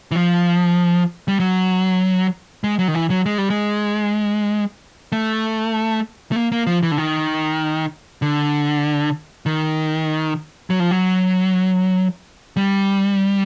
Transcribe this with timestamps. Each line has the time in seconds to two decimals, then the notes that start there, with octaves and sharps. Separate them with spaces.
0.11 E3
0.16 F3
1.28 G3
1.40 F#3
2.64 G#3
2.79 F#3
2.88 D#3
2.95 E3
3.10 F#3
3.26 G#3
3.38 G3
3.50 G#3
5.12 A3
6.32 A3
6.36 A#3
6.52 A#3
6.67 F3
6.83 E3
6.92 D3
6.98 D#3
8.22 D3
9.46 D#3
10.70 F#3
10.80 F3
10.91 F#3
12.57 G3